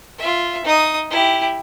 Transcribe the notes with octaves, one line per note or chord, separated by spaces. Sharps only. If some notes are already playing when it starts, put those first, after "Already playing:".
F4 E5
D#4 D#6
E4 G4